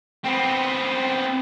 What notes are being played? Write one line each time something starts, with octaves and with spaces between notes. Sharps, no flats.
B3 C4